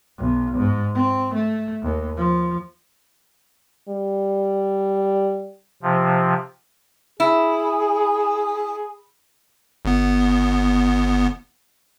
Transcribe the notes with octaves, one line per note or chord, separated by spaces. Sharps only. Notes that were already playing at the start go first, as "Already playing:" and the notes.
B1
G#2
C4
A3
D#2
F3
G3
C3 F3
E4 G#4
G1 B3